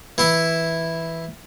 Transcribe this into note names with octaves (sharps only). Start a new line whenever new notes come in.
E3 E4 E5